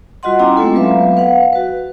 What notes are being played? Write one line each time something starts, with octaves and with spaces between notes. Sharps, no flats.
G3 F4 F#4 D#5 F#5 C6
B3 C#4 E4 G5 A#5 D6
G#3 A3 C4 F4 A4
F#3 B3 B4 E5 F5
B4 F5 F#5
F#4 B4